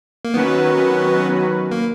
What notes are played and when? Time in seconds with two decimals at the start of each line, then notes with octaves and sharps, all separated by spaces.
0.25 A#3
0.34 D#3 F#3 B3 C#4 F#4 B4
1.71 A#3